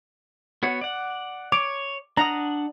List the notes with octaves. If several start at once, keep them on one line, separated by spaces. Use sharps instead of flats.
B3 F#4 C#5
D5 F#5
C#5 D6
D4 F#5 A#5 D#6